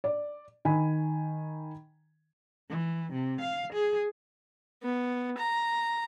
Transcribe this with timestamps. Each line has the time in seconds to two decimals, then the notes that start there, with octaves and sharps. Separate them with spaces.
0.04 D5
0.65 D#3 G#5 B5
2.70 E3
3.12 C3
3.41 F5
3.73 G#4
4.83 B3
5.38 A#5